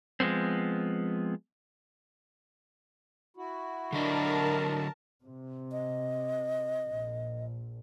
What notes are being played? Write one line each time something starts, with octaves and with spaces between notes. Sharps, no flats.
F3 G#3 A3 B3 C4
E4 F#4
D3 F#3 D4 A#4 D#5 A5
C3
D#5
A#1